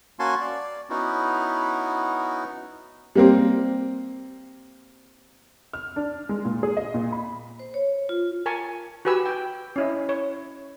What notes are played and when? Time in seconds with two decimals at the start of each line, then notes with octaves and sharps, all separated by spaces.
0.19 A#3 C#4 F#4 G#5 A5 C6
0.41 D5
0.90 B3 C#4 D#4 E4 F#4
3.15 G3 A#3 C4
5.73 F6
5.96 D4
6.29 G#3
6.45 A#2
6.63 G#4
6.77 D#5
6.94 A#2
7.12 B5
7.59 C5
7.74 C#5
8.09 F4
8.46 A#4 G#5 A5 C#6
9.05 F#4 G4 B4 G#5 E6
9.26 G5
9.76 C#4 E4 D#5
10.09 C#5